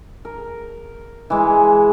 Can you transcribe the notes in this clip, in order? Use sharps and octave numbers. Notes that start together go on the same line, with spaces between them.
A#4
E3 G#3 E4